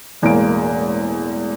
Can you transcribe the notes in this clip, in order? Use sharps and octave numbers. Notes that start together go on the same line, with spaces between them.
E1 E2 A2 G#3 A#3 D7